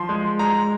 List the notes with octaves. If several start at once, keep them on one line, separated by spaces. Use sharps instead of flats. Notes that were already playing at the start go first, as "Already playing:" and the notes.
Already playing: F3 C6
G#3
G#3 A#5